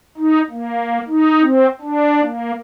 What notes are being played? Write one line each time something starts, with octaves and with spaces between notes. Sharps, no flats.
D#4
A#3
D#4
C4
D4
A#3